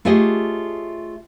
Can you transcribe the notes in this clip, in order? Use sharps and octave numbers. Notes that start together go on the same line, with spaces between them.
A3 F4 G4 G#4 C#5 D#5